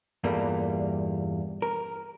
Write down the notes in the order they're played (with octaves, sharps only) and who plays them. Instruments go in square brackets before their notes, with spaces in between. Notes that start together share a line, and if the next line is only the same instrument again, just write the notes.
[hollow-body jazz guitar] E2 G2 A#2 G3 A3 A#3
A#4